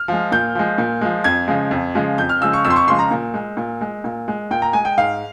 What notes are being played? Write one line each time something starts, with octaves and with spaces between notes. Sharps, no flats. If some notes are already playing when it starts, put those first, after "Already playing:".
Already playing: F6
F3 G#3
A#2 G6
F3 G#3
A#2
F3 G#3
F2 G#6
C#3 F3 G#3
F2
C#3 F3 G#3
F2 G6
F6
C#3 F3 G#3 E6
C#6
F2 E6
C6
C#6
C#3 F3 G#3 C6
A#5
A#2
G#3
A#2
G#3
A#2
G#3
A#2 G5
A#5
G#3 G#5
G5
G#2 F5